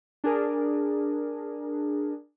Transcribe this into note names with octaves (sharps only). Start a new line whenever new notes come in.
D4 G#4 A#4